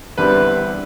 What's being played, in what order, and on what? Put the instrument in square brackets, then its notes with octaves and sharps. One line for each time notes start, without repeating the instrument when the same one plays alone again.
[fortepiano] E2 D3 G3 C4 B4